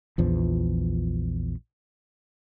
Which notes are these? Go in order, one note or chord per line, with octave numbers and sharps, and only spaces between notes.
A#1 E2 F3